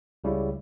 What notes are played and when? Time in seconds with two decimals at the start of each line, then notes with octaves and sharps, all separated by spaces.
0.24 C#2 C#3 G3 C#4 E4